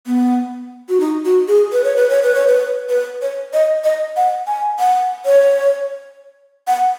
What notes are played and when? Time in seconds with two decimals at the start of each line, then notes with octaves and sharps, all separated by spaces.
0.07 B3
0.89 F#4
1.00 D#4
1.25 F#4
1.48 G#4
1.72 B4
1.84 C#5
1.96 B4
2.10 C#5
2.22 B4
2.35 C#5
2.47 B4
2.89 B4
3.22 C#5
3.53 D#5
3.84 D#5
4.16 F#5
4.47 G#5
4.79 F#5
5.26 C#5
6.67 F#5